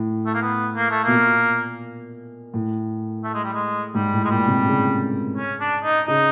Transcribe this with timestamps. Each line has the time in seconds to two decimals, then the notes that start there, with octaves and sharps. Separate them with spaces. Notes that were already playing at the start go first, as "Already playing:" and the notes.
Already playing: A2
0.26 A3
0.34 A#3
0.42 B3
0.76 A#3
0.91 A3
1.04 B2 A#3
1.12 A#2
2.54 A2
3.24 A3
3.34 G#3
3.43 G3
3.53 G#3
3.95 G#2 G3
4.13 A2
4.24 G#3
4.30 A#2 G3
4.48 C3
4.67 C#3
5.37 C#4
5.60 D4
5.83 D#4
6.07 C#3 D#4